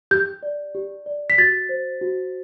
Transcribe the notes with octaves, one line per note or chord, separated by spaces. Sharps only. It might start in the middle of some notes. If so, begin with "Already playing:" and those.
G4 G6
D5
G4
D5
B6
F#4 A6
C5
F#4